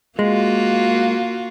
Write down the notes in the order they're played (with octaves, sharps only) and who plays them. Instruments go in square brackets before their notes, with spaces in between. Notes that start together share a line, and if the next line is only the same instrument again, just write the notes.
[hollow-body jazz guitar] G#3 [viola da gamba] A#3 F4 F#4